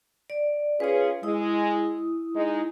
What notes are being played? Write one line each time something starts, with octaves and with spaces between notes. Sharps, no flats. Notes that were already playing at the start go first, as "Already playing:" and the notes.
D5
C#4 F4 G#4 B4 C#5
G#3 E4 D#6
G#3 D#4